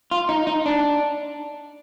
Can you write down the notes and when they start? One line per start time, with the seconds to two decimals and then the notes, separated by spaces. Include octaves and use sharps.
0.11 F4
0.29 D#4
0.47 D#4
0.66 D4